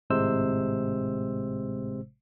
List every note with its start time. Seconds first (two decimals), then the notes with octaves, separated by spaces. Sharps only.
0.10 G#1 A2 C3 G#3 C5 E6